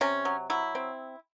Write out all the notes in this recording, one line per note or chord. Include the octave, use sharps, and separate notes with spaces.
C3 C#4
F#3
F#3 E4
C4